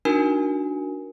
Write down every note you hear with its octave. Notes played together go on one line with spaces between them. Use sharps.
D4 D#4 F#4 A#4 G#5